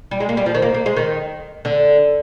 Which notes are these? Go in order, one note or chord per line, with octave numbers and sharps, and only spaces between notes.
G3
G#3
A#3
G3
F3
D#3
A#3
A#3
G#3
D#3
D3